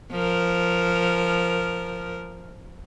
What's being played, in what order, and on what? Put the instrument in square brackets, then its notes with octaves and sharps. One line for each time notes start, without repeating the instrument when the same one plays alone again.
[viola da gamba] F3 A#4